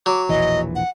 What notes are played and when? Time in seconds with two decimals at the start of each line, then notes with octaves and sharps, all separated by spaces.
0.06 F#3 D6
0.29 E1 A#1 E3 D#5
0.75 F#5